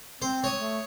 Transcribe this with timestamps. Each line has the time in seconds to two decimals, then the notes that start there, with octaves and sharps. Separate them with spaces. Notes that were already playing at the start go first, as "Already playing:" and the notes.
0.22 C4 C5
0.44 C#5 D#6
0.57 A3